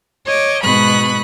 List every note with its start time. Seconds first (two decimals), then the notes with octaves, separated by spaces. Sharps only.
0.25 C#5 D#5 D6
0.63 G#2 B2 B5 C#6 D#6 F#6